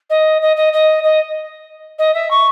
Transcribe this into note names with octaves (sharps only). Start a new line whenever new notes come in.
D#5
D#5
D#5
D#5
D#5
D#5
E5
C#6